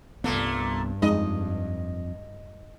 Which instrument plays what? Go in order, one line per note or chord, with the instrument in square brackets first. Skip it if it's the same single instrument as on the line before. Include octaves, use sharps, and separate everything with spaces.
[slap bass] C2 B3 [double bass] G2 [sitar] A#2 A3
[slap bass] F2 [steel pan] G#3 D#4 [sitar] D#5